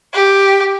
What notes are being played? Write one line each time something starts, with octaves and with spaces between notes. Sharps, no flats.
G4